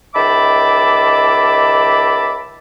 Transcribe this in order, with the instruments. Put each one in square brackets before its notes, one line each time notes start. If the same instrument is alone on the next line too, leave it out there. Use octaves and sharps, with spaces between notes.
[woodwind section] C#2 D#3 E5 A5 B5 D6